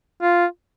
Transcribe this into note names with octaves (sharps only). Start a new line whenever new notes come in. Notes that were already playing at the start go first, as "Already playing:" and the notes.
F4